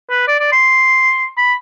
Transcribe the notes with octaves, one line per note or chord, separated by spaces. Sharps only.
B4
D5
D5
C6
B5